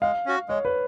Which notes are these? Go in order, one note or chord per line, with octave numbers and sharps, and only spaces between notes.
G#3 F5
C#4 F#4
G#3 C#5
B4